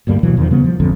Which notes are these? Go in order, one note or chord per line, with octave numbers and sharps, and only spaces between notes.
D2 G2 G3 A#3
D#2 B2 E3 F#3
E2 D#3 F3
C#3 G3 B3
F3
G#1 F2 D3 C4